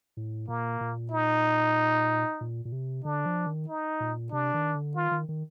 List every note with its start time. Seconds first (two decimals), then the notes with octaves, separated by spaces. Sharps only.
0.17 A2
0.48 A#2 A#3
0.81 A#2
1.12 D#4
2.41 A#2
2.65 A#2
2.72 C3
3.05 D3 D4
3.26 F3
3.46 D#3
3.68 D#4
4.00 A#2
4.32 C3 D4
4.54 D#3
4.75 D3
4.95 D#3 F4
5.11 D#3
5.29 D#3